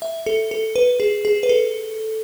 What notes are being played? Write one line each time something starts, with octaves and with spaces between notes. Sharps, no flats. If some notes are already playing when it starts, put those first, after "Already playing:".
E5
A4
A4
B4
G#4
G#4
B4
A4